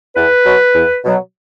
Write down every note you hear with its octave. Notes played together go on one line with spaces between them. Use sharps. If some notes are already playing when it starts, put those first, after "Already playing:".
E2 B4
B2 F#3
E2
B2 F#3